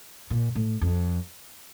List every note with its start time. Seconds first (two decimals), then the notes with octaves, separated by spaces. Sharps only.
0.30 A#2
0.55 A2
0.81 F2